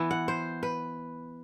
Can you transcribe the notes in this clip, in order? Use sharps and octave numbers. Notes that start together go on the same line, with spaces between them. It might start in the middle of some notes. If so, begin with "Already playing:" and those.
Already playing: E3 B3
F#5
C5
B4